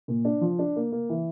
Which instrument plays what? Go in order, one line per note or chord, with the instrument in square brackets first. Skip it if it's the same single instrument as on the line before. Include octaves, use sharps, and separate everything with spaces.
[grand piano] A#2
D4
F3
D4
A#3
A#3
E3